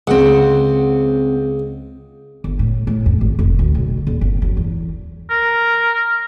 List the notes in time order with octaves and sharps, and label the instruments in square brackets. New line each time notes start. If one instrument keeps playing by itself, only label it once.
[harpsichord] C#2 [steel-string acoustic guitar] C4 F#5
[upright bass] G1
A2
A2
F2
G#1
F1
D2
B1
D#1
G1
F#3
E2
[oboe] A#4